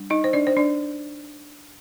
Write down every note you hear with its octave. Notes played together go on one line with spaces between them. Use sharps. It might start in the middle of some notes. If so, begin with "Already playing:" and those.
Already playing: G3 D4
D#4 D#5
C5
D4 D5
C5
D4 D5